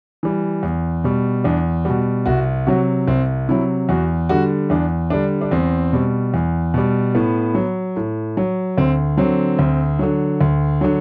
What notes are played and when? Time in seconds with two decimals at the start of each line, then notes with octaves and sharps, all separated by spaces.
0.23 E3 G3
0.63 E2
1.04 B2 G3
1.44 E2 D4
1.85 B2 G3 F#4
2.26 C2 F#4
2.67 C3 F#3 F#4
3.07 C2 C4
3.49 C3 F#3 E4
3.89 E2 F#4
4.29 D3 G3 F#4
4.70 E2 D4
5.10 D3 G3 D4
5.41 D4
5.51 E2 C4
5.93 B2 G3
6.34 E2
6.74 B2 G3
7.15 A2 B3
7.55 F#3
7.96 A2
8.37 F#3
8.78 D2 C4
9.17 D3 F#3 C4
9.59 D2
9.99 D3 F#3
10.41 D2
10.81 D3 F#3